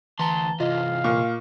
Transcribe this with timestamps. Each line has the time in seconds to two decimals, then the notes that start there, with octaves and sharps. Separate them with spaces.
0.19 D2 E3 A5 A#5 C6 G7
0.60 C3 E3 F4 D#5 F5
1.04 A#2 C#6